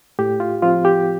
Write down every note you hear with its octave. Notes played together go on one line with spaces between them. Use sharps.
A2 G4
F4
F3 C4 F4
G4